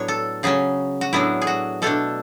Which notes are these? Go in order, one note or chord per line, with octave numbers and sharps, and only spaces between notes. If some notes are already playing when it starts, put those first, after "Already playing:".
Already playing: A2 F#3 B3 D4 C#5
A4
C#3 F#3 C#4 G#4
F#4
A2 F#3 B3 D4 E4
G#4
F#4
B2 A3 D4 A4